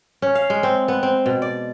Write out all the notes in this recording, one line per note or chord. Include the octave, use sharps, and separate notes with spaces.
C#4
F5
G#3
C4
B3
C4
B2
D5